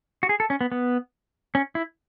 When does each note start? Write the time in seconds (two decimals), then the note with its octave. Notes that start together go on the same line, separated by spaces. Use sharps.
0.23 F#4
0.29 G#4
0.40 A4
0.50 C#4
0.61 B3
0.72 B3
1.55 C#4
1.75 E4